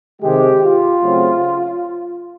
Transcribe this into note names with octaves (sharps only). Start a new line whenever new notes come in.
C3 D#3 G#3 G4
F4
C#3 F#3 A3 C4